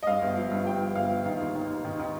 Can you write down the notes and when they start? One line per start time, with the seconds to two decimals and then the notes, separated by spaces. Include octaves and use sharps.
0.03 D#5
0.07 G2 F5
0.22 G1
0.37 F3
0.51 G2
0.66 G2 G5
0.81 F3
0.95 G1 F5
1.10 F3
1.25 D#3
1.40 D#2
1.55 D#3
1.70 D#2
1.84 D#3
1.99 D#3